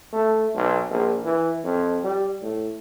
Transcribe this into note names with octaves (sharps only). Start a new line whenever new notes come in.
A3
B1
A#1
E3
F2
G3
A2